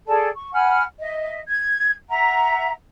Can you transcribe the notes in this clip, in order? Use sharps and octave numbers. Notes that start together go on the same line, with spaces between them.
G#4 A4 D5 A5
C#6
F#5 G#5 B5 F6
D#5 E5
G#6
E5 F#5 A#5